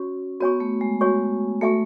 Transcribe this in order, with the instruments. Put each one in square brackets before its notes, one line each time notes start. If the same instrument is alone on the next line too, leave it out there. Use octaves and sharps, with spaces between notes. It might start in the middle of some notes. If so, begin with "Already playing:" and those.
Already playing: [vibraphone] C#4 [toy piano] F#4 C#5 C#6
[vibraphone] B3 [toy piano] F#4 C#5 G#5 C#6
[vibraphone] A3
G#3
[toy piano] F#4 C#5 G#5 C#6
[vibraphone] A3 [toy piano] F#4 A4 E5 G#5 C#6